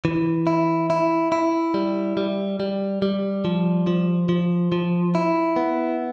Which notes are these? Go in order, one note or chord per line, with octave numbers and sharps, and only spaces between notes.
E3
E4
E4
E4
G3
G3
G3
G3
F3
F3
F3
F3
E4
B3